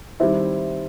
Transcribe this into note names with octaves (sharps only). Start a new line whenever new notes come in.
D#3 G3 C4 E4 E5